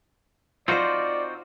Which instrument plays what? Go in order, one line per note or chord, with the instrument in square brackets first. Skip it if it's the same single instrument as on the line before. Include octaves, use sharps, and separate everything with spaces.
[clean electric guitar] C4 D#4 F#4 [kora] F4 C5 [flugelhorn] D5